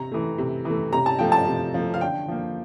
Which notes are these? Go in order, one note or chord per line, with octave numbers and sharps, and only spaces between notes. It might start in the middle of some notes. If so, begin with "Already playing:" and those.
Already playing: C3 A#5
E3 A3
C3
E3 A3
C3 A#5
A5
F3 A3 G5
A5
C3
F3 A3
F5
D3 G5
F3 A#3